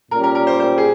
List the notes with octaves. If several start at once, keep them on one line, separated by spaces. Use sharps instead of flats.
A#2 G3 C#4 G4 A#4
A#4
A#4
C5
C5
G#4